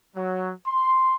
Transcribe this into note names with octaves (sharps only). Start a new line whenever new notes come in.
F#3
C6